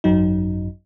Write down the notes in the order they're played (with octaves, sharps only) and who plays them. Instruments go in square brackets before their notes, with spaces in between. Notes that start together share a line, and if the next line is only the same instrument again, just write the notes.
[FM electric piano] G#1 F#2 F#3 D#4